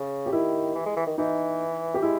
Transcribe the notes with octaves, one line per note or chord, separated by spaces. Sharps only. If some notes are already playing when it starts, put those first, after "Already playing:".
Already playing: C#3
G4
D#3 E4
E3
G#3
E3
D#3
E3 D#4
G4
G#3 E4